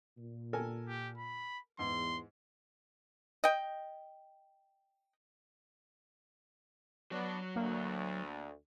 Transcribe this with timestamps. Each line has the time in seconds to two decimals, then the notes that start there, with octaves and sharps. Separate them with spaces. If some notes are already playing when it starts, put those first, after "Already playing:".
0.18 A#2
0.53 A4 A#4 G#5
0.88 G4
1.18 B5
1.79 E2 G#2 C6
3.44 D#5 G5
7.12 F#3 B3 D4 C#5
7.56 D2 A#3